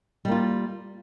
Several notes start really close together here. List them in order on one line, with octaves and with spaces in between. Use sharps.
G3 A#3 F4